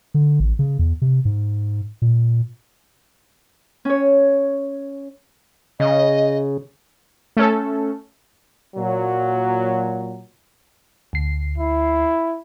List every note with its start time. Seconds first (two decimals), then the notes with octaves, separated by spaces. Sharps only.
0.14 D3
0.40 A1
0.59 C#3
0.79 E2
1.02 C3
1.25 G#2
2.02 A#2
3.85 C#4 C#5
5.80 C#3 D#5
7.37 A3 C#4 A4
8.76 A#2 F#3
11.13 D2 C7
11.58 E4